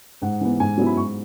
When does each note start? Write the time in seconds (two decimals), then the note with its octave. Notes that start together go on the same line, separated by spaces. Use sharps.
0.22 G#2 F#5
0.41 E3 B3
0.59 G#2 G#5
0.78 F#3 B3 E4
0.86 B5
0.97 G#2 C#6